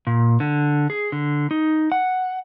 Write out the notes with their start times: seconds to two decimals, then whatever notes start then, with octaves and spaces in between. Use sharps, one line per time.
0.07 A#2
0.40 D3
0.90 G#4
1.12 D3
1.51 D#4
1.92 F#5